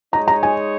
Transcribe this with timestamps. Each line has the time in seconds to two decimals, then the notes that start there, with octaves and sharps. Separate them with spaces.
0.12 G#3 D#4 C#5 A#5
0.28 A#5
0.43 G#5